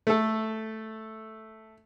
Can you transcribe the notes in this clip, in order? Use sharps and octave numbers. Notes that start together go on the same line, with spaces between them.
A3 A4